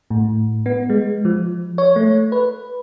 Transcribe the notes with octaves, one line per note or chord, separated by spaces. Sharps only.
A2
B3
G#3
F3
C#5
A3
B4